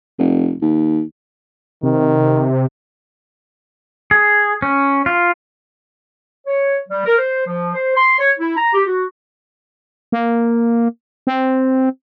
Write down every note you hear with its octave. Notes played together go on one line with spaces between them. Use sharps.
F1
D#2
C3 D#3
G#4
C#4
F4
C#5
G3
A#4
C5
F3
C5
C6
C#5
E4
A#5
G4
F#4
A#3
C4